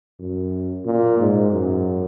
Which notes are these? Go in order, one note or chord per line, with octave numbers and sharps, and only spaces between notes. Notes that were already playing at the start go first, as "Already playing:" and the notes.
F#2
A#2
G#2
F#2